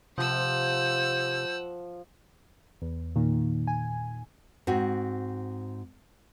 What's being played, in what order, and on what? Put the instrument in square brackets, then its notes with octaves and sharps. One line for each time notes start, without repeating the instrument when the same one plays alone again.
[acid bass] C3 [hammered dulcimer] F3 [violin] F#5 E6 [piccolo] G6
[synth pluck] E2
A#2 D#3
G#5
[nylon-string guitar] G#2 C4 F#4